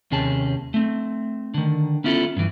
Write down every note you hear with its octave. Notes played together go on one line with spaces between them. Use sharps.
D#2 C3 C#4 G#4 A5
A3 C4
D3 D#3
B3 C#4 E4 F4 A4
G2 E3